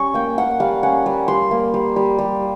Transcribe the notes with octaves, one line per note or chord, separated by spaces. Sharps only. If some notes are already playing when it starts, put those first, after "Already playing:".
Already playing: G3 C#4 C#6
A#3 G5
A#3 F#5
G3 F5
C#4 F#5
G3
G3 C6
A#3
G3
G3
G3